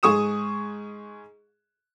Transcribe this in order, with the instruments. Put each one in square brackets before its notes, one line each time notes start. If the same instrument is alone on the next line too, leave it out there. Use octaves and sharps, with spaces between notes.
[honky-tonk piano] G#2 G#4 C#6 D#6 E7